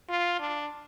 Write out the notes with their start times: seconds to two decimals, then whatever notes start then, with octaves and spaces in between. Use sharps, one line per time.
0.09 F4
0.39 D4